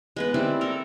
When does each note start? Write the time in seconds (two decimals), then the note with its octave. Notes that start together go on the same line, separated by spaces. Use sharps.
0.16 G#3 B3 B4
0.34 G3 C4 E4 D5
0.61 A4 A#4